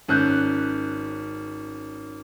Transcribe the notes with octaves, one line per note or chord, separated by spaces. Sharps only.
G#1 C#4 F#6 G6